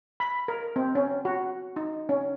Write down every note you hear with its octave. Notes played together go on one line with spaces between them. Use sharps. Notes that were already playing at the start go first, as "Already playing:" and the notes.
B5
A#4
C4
C#4
F#4
D#4
C#4